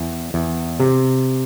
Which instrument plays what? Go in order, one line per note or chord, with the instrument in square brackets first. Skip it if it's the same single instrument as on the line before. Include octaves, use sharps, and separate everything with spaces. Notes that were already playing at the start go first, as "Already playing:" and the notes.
Already playing: [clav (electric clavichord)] E2
E2
C3